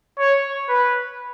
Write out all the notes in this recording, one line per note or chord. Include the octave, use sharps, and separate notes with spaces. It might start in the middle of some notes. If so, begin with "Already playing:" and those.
C#5
B4